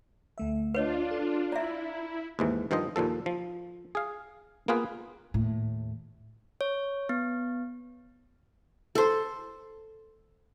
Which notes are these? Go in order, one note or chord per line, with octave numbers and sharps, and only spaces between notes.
D2 A3 E5
D4 F4 B4 C#5 D#5
A4
E4 D5 E5 A#5
D#2 G#2 E3
G2 D#3 F3 C5 D#5
D#2 A#2 F3 A4
F3
G#4 F5
A#3 B3 F4 G#4 B4
D#2 A2
C#5
B3
A4 C5